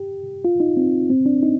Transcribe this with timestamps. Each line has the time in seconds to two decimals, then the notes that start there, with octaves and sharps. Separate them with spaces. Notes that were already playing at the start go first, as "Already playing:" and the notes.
Already playing: G4
0.45 F4
0.60 D#4
0.77 C4
1.10 C4
1.26 D4
1.43 D#4